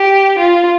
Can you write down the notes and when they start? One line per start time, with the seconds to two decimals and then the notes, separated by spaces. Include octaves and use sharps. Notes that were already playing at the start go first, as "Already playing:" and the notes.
Already playing: G4
0.40 F4